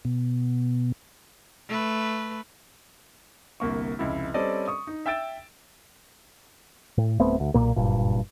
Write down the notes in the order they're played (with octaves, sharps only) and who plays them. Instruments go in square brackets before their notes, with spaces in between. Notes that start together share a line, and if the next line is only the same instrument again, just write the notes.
[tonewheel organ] B2
[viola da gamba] A3 B4
[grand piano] G1 C2 A#3 C#6
F1 C#2 E4
G3 C4 C#4 A4 D5 D#5
C#6 D#6
D#4
E5 G5 E6 A6 D7 E7
[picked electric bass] A2
D1 A3 B3 C4
D2
B1 A#2 A#3
F#1 G2 A#2